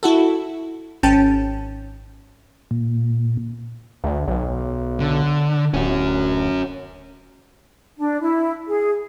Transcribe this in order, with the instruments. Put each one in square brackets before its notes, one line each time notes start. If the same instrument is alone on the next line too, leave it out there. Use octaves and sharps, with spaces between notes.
[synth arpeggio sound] E4 F#4 A4
G#1 C#4 G5 A5
[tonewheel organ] A#2
[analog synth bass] D2
B1
[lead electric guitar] D3
[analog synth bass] D1 [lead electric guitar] C#4 F#4
[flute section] D4
E4
G#4